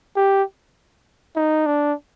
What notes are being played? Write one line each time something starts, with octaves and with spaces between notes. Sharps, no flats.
G4
D#4
D4